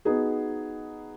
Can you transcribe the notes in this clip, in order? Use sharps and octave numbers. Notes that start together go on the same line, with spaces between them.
B3 D#4 F#4 G#4